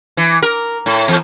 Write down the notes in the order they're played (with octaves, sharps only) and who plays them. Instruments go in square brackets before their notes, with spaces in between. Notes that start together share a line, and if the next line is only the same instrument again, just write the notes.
[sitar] E3
A#4
A2
E2